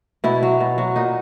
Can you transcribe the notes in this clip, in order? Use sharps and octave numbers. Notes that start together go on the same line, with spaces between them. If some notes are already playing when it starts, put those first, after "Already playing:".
B2 E4
F#3
B2
F#3
A#2 D#4